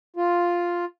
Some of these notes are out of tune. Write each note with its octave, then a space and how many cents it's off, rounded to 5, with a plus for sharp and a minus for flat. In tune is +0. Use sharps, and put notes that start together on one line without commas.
F4 +0